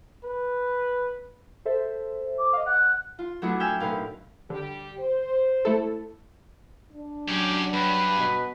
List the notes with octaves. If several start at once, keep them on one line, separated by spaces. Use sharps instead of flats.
B4
A4 C5 E5
D6
D#5 F5
F#5 F#6
F4
F#3 A3 B3 D4 E4 F#4
G5 G#5 E6 F6 B6
B1 A2 A#3 B4 F5
D3 G3 G4
C5
A3 E4 A4
D4
F#3 C#4 G4
G2 B4
B2